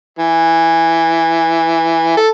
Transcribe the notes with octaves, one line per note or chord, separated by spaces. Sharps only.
E3
A4